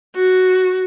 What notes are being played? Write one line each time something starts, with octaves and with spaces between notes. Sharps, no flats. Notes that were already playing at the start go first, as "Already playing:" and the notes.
F#4